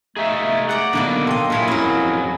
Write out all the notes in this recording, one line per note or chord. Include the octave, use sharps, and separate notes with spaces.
A3 D#4 G#4 E5 F5
G#3 D5 F#5 A#5
B2 D3 D#3 F#3 G3 A#3 D5
A4 D#5 G5 C6
A#2 E4 G#4 A4 C#5 F5
F2 F#3 C#4 E4 A#4